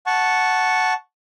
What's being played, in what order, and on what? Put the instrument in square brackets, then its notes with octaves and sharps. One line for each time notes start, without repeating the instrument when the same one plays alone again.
[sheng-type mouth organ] F#5 A5 C#6